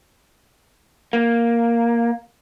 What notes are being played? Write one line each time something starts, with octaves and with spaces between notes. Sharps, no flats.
A#3